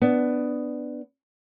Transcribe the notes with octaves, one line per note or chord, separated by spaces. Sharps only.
B3 D4